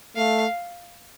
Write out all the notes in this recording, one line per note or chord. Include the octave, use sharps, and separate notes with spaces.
A3 F5